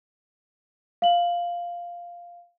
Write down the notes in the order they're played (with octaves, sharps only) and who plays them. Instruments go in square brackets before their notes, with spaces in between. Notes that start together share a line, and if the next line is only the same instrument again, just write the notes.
[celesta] F5 F#7